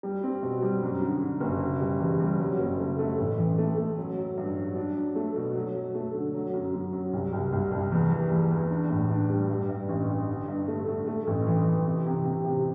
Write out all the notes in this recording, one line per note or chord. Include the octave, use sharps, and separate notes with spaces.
G3
C4
B2
G3
F#2
D3
D3
F#1
B2
G3
E2
G3
F#3
F#1
A3
A3
A1
E3
A3
A3
F#3
F#3
G2
F#3
D4
F#3
A3
B2
F#3
F#3
A3
D3
F#3
F#2
F#2
F#3
C2
C2
C2
C2
E2
E3
E2
E2
D4
A2
D4
G3
G2
G2
A1
G2
D3
G2
A3
A3
A3
A1
E3
E3
C3
C3
C3
C3